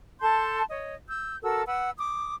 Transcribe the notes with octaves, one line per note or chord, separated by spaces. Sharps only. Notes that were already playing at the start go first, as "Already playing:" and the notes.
A4 A5 C6 G6
C#5 D#5
E6 G6
F#4 A4 A#4 E6
B4 F#5 E6
D6 D#6